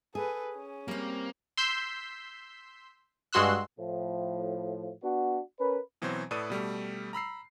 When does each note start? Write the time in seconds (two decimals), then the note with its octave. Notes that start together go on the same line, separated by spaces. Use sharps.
0.15 G#4 A4 B4
0.55 C#4
0.88 G3 A#3 C4
1.57 C6 E6 G6 B6
3.33 G2 G#3 F#4 C6 E6 F#6
3.79 A2 F3
5.03 B3 D4 F#4
5.60 C#4 A#4 B4
6.02 B2 E3 F#3 C4 C5
6.31 A2 A4 B4 D5 D#6 D#7
6.50 B2 G3 A3
7.13 A#5 B5 E6 C7